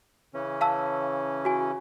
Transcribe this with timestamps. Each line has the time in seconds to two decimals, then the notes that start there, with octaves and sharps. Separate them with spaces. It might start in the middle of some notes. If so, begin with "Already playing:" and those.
0.34 C#3 E3 C#4
0.61 F5 A5 E6
1.45 F#4 G#5